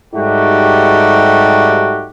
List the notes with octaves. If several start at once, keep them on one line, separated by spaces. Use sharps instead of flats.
G#2 G3 A3 D#4 F#4 G4